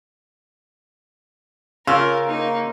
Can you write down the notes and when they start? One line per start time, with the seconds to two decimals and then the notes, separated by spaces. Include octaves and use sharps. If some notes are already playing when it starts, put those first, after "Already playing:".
1.87 C#3 F4 A#4 C#6 E6 F6
2.27 A#3 D#4